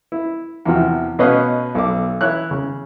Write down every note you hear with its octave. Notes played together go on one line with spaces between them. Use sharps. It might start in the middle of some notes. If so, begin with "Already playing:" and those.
E4
E2 C3 F3 F#4
B2 C#4 B4 D#5 F5
B1 A4 D6
E3 E4 C#5 F#6
C#3